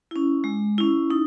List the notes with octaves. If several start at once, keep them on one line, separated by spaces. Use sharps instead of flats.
C#4 E4
G#3
C#4 E4
D#4